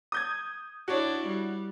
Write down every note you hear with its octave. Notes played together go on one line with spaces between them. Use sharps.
D#6 G6 G#6
D4 E4 F#4 C#5
G3